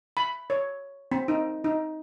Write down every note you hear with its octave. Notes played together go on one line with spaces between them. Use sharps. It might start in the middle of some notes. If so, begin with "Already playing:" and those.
B5
C#5
C4
D#4
D#4